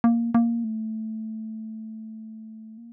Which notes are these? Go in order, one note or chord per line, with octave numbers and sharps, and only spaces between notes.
A#3
A#3
A3
A#3